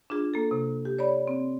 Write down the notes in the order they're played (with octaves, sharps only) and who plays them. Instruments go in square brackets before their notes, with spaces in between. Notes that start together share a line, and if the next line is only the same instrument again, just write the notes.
[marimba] D4 F4 G#4
A#3 A4
C3
G4
C#5 D5 B5
C4